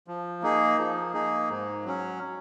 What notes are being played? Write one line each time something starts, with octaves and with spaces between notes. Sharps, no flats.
F3
A#3 D#4 G#4
F3
A#3 D#4 G#4
G#2
F#3 C#4